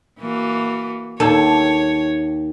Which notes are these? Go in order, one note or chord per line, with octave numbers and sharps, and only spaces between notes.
E3 A#3 F#4
D#2 A4 C#5